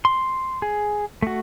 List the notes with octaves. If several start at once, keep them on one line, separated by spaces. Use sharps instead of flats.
C6
G#4
A3 F#4